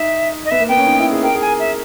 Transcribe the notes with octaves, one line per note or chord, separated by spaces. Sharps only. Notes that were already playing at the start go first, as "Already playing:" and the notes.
Already playing: D#4 E5
D#5
B3 E5
A#3
B3 G5
C#4
D#4
E4
G#4
A#4 G5
G#4
G#5
A#4
E5